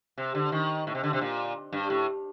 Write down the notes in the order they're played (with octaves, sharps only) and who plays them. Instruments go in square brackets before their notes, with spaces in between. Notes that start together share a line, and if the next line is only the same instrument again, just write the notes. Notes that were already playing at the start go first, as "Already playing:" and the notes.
[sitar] C3
D3
D#3
A2
C3
D3
C3
A#2
G2
A2